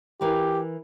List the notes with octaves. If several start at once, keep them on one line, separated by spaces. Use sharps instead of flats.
E3 G4 A#4 B4